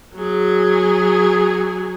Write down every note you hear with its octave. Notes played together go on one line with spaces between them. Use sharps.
F#3 G#4